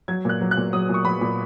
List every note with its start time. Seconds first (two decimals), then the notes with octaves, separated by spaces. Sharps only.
0.08 F#3 G#6
0.25 A#2 F#6
0.41 F#3
0.51 F#6
0.57 A#2
0.73 F#3 D#6
0.89 A#2 C#6
1.05 F#3 B5
1.21 A#2